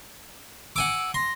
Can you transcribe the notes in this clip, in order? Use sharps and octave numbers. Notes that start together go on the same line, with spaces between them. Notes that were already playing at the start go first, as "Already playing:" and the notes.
F#5 G#5 D6 E6
C6 A#6